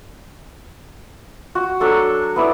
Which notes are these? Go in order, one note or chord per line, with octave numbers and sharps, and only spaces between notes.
F#4
F#3 D4 A4 C#6
B3 E4 D5